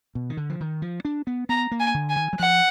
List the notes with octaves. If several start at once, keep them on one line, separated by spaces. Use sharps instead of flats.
B2
D#3
D3
F3
D#3
F3
D4
B3
B3 A#5
A#3
G#5
D3
G#5
D#3
F#3
F3 F#5